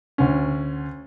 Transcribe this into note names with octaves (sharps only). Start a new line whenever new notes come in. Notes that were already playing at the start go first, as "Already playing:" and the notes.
D2 C#4